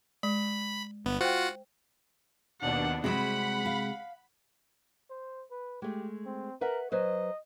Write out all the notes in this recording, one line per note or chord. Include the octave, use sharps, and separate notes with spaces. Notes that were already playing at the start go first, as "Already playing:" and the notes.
G#3 B5
G1 B3
F4 F#4 C5 F#5 G5
D#2 B2 D4 F#5
C3 G3 G#3 C4 F#4 G#4 F#5 B5
F5
C5
B4
G#3 A3 G4
C4
A#4 B4 E5 F#5
F#3 B4 C5 D#5